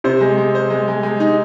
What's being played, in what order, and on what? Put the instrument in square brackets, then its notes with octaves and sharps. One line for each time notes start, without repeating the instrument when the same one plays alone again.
[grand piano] C3 [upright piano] C5
[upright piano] G#3
G#3
C5
G#3
G#3
G#3
D#4